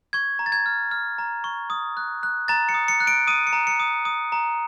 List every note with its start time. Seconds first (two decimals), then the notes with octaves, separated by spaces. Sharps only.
0.13 C#6 G#6
0.39 A#5
0.46 A6
0.52 G#6
0.66 F6
0.91 F6
1.19 A#5
1.44 C#6
1.70 D#6
1.97 F#6
2.23 F#6
2.48 A#5 A6
2.69 C#7
2.74 D#6
2.88 C#7
3.00 F#6
3.07 D7
3.27 D#6 D#7
3.47 C#7
3.53 A#5
3.67 C#7
3.80 D#6
4.05 D#6
4.32 A#5